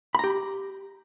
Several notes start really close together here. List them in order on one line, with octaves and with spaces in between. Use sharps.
B5 A#5 G4